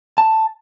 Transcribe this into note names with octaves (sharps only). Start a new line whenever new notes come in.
A5